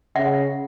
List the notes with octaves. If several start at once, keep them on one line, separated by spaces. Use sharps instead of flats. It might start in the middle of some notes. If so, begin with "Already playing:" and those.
C#3 E5 F#5